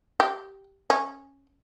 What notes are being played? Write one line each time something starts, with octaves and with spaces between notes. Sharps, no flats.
G4
C#4